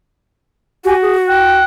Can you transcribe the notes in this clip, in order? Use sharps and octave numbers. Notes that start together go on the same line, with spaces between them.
F#4 G4 G#5
G#4
G5 F#6